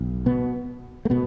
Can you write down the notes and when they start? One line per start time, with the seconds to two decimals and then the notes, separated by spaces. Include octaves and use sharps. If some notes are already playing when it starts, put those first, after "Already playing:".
Already playing: B1
0.26 B2 B3
1.05 A3
1.10 B2 B3